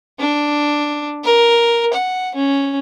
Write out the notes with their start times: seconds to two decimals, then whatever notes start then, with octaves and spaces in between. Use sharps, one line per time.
0.20 D4
1.24 A#4
1.93 F#5
2.35 C#4